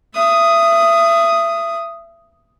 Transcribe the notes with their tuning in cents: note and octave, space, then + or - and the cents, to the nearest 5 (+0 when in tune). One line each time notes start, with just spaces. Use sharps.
E5 +30 D#6 +0